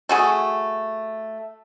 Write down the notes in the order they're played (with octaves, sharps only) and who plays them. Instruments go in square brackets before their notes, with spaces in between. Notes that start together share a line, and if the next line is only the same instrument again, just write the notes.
[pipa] A3 F#4 G#4